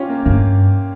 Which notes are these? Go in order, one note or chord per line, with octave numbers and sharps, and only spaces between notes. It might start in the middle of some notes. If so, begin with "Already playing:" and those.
Already playing: C#4 F4 G4
A#3
G2 A#3